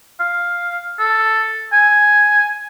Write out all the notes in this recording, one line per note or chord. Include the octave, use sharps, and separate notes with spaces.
F5
A4
G#5